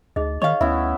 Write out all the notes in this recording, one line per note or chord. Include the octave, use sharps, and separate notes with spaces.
D2 D#4 G#4 D#5
D#3 C#5 D#5 F5 C#6
D2 B3 C#4 E4 E5